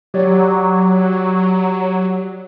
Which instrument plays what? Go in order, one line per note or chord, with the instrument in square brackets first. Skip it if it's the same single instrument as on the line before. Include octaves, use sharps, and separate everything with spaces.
[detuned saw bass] F#3 [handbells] G4 C#5 D5